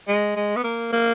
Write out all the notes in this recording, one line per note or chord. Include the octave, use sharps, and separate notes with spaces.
G#3
G#3
B3
A#3
A#3